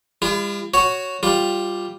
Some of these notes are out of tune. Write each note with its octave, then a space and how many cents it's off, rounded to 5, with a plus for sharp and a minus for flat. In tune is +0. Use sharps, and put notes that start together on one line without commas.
G3 +45 F4 -45
F#4 +0 C#5 +0
G3 +0 F4 +5